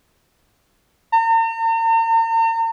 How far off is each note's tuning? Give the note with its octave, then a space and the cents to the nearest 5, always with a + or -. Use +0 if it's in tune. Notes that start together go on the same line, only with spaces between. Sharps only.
A#5 -45